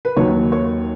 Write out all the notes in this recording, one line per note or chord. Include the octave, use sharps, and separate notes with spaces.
B4
D#2 D#3 F#3 C#5
C#5